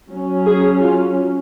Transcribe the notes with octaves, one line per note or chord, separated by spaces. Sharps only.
F#3 C#4
G#4
F4